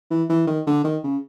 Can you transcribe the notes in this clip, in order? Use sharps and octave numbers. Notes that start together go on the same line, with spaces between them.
E3
E3
D#3
D3
D#3
C#3